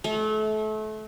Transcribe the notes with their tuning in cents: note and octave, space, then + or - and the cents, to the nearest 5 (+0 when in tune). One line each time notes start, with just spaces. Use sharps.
A3 -30